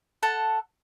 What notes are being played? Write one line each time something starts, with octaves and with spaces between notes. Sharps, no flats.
A4 F#5 A5